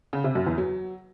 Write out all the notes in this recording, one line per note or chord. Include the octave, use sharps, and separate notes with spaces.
C#3
C3
F#2
E2
F#3